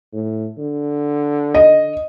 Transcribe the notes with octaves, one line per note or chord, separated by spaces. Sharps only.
A2
D3
D#5